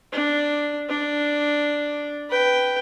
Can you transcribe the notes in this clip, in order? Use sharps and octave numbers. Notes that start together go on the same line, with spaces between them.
D4
D4
B4 G5